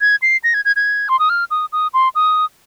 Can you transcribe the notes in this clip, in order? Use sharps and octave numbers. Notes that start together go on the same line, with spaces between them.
G#6
C7
A#6
G#6
G#6
G#6
C6
D#6
F6
D#6
D#6
C6
D#6